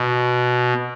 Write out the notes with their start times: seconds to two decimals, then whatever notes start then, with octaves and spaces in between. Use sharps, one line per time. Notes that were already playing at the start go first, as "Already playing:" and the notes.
Already playing: B2